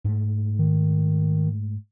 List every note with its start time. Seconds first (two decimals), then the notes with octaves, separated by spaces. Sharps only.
0.04 G#2 A3
0.59 D#3